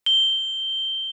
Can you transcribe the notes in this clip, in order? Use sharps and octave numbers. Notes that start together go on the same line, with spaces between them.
G7